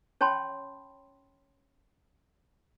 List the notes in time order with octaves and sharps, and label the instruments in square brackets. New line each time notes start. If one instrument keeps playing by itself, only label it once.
[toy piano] C#4 C#5 G5 A5 B5 C6